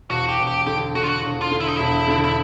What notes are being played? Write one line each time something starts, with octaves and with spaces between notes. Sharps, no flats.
E1 F#4
G4
E1
G4
D3 G4
D3 F#4
F4
F#4
E1
F4
D3
E4
D#4
E1 E4
D3
E4